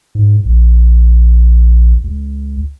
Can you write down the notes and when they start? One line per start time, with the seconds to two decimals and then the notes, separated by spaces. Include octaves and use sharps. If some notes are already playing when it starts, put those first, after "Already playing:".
0.15 G#2
0.45 A#1
2.04 C#2